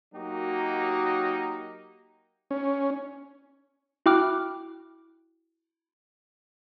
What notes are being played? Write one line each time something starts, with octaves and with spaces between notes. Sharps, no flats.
F#3 A#3 D#4 F#4 G4
C#4
E4 F#4 G5 D6 F6 F#6